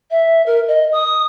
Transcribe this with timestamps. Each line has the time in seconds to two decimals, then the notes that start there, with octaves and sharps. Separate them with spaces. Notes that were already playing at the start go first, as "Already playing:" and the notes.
0.11 E5
0.46 A#4
0.68 D#5
0.92 D#6